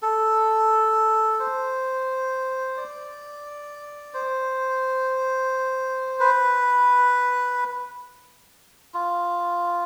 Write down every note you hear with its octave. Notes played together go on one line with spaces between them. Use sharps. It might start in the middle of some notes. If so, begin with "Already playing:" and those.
A4
C5
D5
C5
B4
F4